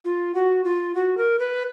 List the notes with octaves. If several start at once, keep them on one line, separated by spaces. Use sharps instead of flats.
F4
F#4
F4
F#4
A#4
B4